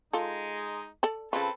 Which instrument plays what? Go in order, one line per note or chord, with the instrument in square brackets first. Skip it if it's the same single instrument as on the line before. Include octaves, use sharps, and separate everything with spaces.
[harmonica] G#3 D#4 [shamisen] F4 A4
[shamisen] A4 D5 A5
[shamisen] C#3 F4 [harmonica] C4 A4 B4